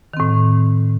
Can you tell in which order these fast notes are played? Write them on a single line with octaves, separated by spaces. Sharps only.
D#3 C4 A2